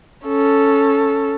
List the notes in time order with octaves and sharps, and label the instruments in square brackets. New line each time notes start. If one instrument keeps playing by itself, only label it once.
[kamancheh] C#4 A4